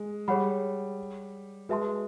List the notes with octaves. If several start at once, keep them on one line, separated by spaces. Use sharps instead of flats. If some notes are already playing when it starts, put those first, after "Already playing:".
Already playing: G#3
G3 G#4 C#5 F#5 B5
G#3 F#4 B4 E5 A5 C6